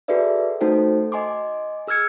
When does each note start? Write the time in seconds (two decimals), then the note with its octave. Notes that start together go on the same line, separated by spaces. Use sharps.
0.08 F#4 G#4 A4 B4 D5 E5
0.61 A3 D#4 F#4 A4 C5 G5
1.12 D#5 G#5 C6 D6
1.87 G#4 E6 F6 G#6 C#7